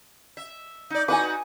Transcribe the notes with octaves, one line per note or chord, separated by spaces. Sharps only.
E5
D#4 D5
D#4 F#4 B4 G#5 D6